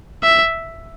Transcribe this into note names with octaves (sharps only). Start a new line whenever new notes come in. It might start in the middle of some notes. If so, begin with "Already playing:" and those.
E5